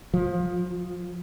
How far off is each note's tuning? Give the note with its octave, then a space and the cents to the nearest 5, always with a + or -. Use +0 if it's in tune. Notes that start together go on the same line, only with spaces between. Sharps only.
F3 +20